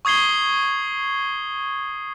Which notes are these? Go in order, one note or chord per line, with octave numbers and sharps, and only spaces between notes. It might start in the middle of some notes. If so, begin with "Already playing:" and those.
C#6 D#6 G#6 C7 G7